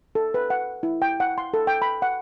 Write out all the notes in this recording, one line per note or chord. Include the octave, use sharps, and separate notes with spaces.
A4
B4
F#5
E4
G5
F#5
C6
A4
G5
B5
F#5